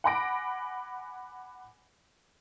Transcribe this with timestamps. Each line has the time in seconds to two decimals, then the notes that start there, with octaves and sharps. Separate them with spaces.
0.04 F#5 G#5 B5 D6 A#6 D7